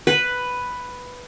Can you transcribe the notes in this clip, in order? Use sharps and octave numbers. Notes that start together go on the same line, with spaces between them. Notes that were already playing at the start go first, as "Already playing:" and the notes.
B4